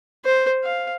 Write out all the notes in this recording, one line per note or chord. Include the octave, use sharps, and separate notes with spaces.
C5
F5